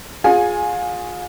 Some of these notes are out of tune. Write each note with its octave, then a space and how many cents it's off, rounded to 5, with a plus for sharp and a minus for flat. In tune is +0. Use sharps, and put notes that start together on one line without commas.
F4 +35 G#4 +0 G#5 +0